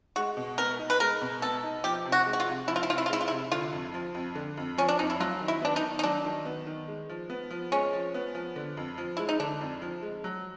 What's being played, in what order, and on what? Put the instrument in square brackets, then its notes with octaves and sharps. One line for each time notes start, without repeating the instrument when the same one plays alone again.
[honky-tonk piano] G#3 [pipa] F#4
[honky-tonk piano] B2
[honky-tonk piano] B3 [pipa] A#4
[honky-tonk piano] D#4
[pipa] B4
[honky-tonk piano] G#3 [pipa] A#4
[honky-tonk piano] B2
[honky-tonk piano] B3 [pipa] A4
[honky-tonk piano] D#4
[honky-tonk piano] F3 [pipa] G4
[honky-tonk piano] C3
[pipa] F#4
[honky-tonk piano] G#3
[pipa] F#4
F4
[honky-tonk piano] C3
[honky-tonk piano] F3 [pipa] E4
[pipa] F4
E4
[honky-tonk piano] C3 [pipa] F4
[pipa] E4
F4
[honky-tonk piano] G#3 [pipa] E4
[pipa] F4
E4
[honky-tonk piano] C3
[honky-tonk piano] D3 [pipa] F4
[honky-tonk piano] F2
F3
F2
D3
F2
[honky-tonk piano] F3 [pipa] C#4
[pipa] D4
[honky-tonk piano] F2 [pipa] D#4
[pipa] E4
[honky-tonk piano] F#3 [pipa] F4
[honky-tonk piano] D#3
[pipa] E4
[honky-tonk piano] B3 [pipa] D4
[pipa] D#4
[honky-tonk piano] D#3
[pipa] D#4
[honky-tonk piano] F#3 [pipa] D4
[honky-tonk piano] D#3
B3
D#3
G#3
F3
B3
F3
[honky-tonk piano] G#3 [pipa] C#4
[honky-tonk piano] F3
B3
F3
D3
F2
F3
[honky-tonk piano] G#3 [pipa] E4
[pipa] D#4
[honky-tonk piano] D3 [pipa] D4
[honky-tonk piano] F2
F3
G#3
F#3